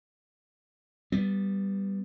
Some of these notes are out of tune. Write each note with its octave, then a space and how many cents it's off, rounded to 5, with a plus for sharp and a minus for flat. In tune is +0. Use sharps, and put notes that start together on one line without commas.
G3 +0 B3 +0